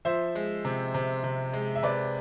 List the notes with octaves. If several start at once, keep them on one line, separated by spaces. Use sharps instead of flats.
F3 C5 E5
G#3
C3
C3
C3
G#3
E5
C3 B4 D5